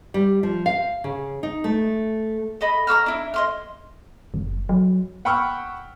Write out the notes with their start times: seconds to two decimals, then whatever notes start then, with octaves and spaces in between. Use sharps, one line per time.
0.14 G3
0.43 F3
0.66 F5
1.04 C#3
1.43 D#4
1.64 A3
2.61 A4 D#5 B5
2.87 A#5 D6 E6 F6
3.06 D4 E4
3.34 D#5 C6 F6
4.34 F#1
4.69 F#3
5.25 F#5 G5 B5 C#6 E6 F6